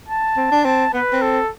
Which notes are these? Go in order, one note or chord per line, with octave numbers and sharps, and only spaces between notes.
A5
C4
D4
C4 A5
B3 B4
C4
A4